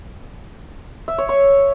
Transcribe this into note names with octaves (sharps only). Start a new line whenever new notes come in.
E5
C#5
C#6